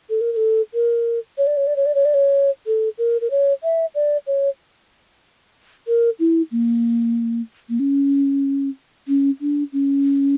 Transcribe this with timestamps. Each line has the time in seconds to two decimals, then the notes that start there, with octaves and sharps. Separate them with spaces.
0.10 A4
0.21 A#4
0.32 A#4
0.36 A4
0.74 A#4
1.38 C#5
1.47 D5
1.57 C#5
1.67 D5
1.76 C#5
1.86 D5
1.95 C#5
2.05 D5
2.14 C#5
2.66 A4
2.98 A#4
3.21 A#4
3.31 C#5
3.63 E5
3.95 D5
4.27 C#5
5.87 A#4
6.19 E4
6.51 A#3
7.69 A#3
7.79 C#4
9.08 C#4
9.41 D4
9.72 C#4